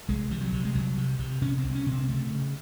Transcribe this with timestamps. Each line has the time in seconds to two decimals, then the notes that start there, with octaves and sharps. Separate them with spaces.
0.09 C2 G#3
0.31 C3 E3
0.41 F#3
0.53 C3
0.65 G#3
0.75 C2 F#3
0.98 C3
1.19 C3
1.42 C3 C#4
1.59 C4
1.64 C2
1.75 C#4
1.86 C3
1.92 C4
2.08 C#3 A3
2.31 C#3